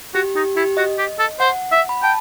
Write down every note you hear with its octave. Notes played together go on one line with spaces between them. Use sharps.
F#4 G4
D#4 G4
E4 G4
F#4 D#5
G4
A4
C5 F#5
E5
B5
G5 A5